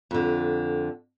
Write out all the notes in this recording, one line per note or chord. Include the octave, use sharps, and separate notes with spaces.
F2 D3